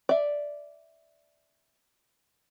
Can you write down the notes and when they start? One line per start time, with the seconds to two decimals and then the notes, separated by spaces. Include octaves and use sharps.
0.09 D5 E5